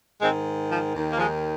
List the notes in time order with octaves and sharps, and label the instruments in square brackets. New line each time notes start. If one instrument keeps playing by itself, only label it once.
[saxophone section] G#2 D#3 G#3 C4
F3
D#2 D#3
A#3
F3 G#3